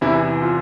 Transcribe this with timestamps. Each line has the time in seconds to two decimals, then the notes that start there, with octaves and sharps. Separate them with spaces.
0.01 E2 C3 E3 E4
0.42 F4